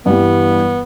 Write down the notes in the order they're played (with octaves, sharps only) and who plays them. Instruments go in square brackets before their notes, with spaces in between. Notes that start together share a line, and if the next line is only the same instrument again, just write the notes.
[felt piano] G2 E3 G3 [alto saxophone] B3